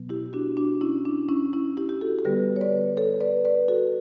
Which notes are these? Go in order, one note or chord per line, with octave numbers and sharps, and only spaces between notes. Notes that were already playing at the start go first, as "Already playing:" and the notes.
Already playing: B2 F#3 B3
E4 G4
D4 F#4
D4 F#4
C#4 E4
D4
C#4 E4
C#4 E4
E4 G4
G4
F#4 A4
A4
D3 G3 B3 G4 B4
C#5
B4 D5
A4 C#5
B4 D5
B4 D5
F#4 A4